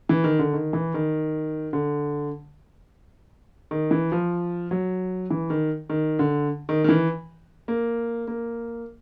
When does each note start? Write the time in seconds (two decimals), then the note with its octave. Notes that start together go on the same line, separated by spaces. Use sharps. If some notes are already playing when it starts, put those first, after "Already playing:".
0.09 E3
0.24 D#3
0.39 D3
0.53 D#3
0.73 E3
0.94 D#3
1.73 D3
3.71 D#3
3.91 E3
4.12 F3
4.71 F#3
5.30 E3
5.50 D#3
5.89 D#3
6.19 D3
6.69 D#3
6.84 D#3
6.89 E3
7.68 A#3
8.28 A#3